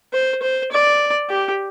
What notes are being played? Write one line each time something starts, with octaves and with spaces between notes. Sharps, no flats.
C5
C5
D5
G4